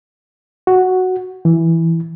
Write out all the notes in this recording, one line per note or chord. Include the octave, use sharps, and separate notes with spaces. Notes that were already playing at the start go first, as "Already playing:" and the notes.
F#4
E3